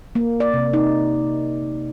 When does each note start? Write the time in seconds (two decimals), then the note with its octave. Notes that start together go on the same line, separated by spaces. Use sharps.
0.15 A#3
0.40 D5
0.53 C3
0.73 D#4